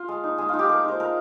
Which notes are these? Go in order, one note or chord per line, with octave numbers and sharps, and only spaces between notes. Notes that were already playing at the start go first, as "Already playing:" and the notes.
Already playing: F4
G#3
D#4
G#3 G#4
D#4 F4
G4
G#3 A#4
D#4 C5
G#3 A#4